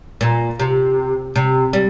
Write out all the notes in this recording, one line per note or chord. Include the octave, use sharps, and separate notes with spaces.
A#2
C3
C3
G3